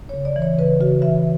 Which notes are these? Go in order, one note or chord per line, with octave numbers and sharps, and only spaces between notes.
C#5
C#3
D5
E3
C#5
C#3 B4
C#3 F#4
E3 E5